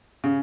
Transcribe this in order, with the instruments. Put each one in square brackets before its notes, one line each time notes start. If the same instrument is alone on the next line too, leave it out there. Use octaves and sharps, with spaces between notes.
[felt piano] C#3